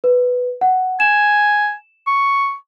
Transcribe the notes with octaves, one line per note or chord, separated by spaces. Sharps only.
B4
F#5
G#5 E7
C#6